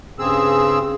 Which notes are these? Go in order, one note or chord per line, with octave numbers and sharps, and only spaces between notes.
G2 C#3 C4 G#4 E6